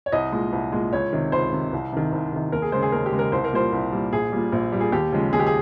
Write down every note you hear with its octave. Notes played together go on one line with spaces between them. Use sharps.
C#5
C2 D#5
A#2 G#3
C2
A#2 G#3
C#2 C#5
C3 D#3
C#2 C5
C3 D#3
C2
C3 D#3
C2
C3 D#3
D#2 A#4
G#4
C#3 G#3 C5
G#4
D#2 A#4
G4
C#3 G#3
A#4
C2 C5
A#4
A#2 G3 C5
C2
A#2 G3
A#1 G#4
A#2 G3
A#1
A#2 G3
G#4
D#2 G4
C#3 F3 G#3
D#2 G#4
G4
G#4